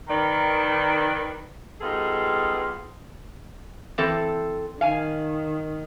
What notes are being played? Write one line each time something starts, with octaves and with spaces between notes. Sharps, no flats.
D#3 B4 D5
G3 B3 D#4 F4 G#4 A4
E3 C4 A4
D#3 F5 G#5